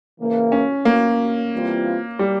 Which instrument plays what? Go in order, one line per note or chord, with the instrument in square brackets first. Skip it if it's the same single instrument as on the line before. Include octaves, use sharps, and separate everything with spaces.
[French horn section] C#3 E3 A#3
[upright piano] C#4
A#3
[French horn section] E3 G3 C4 F4
[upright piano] G3